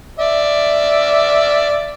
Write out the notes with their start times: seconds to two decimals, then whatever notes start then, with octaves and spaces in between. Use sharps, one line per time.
0.19 D5 E5